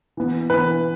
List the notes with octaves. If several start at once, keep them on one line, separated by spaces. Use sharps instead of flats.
E3 B3
E3 B3 B4